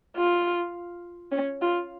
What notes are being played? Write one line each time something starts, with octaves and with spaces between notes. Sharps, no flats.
F4
C#4
F4